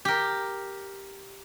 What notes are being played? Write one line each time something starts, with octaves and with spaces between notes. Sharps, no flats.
G4 A#4